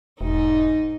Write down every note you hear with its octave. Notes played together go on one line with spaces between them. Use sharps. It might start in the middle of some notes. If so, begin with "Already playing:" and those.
E1 G#2 D#4